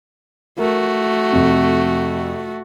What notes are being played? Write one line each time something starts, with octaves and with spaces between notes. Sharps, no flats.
A3 F#4 A#4
F2 C3